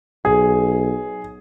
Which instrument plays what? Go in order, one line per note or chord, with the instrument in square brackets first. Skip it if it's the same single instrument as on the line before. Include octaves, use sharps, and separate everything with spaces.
[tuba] B1 [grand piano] G#4